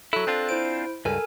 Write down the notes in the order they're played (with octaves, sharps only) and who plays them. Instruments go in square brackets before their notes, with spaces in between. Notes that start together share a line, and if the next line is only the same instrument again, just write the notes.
[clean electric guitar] F#3 E4 [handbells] A4 F#6
[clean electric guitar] C4 D4 F4
[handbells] E4 C5 D7
[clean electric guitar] C#2 G2 [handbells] A4 A#4 G#5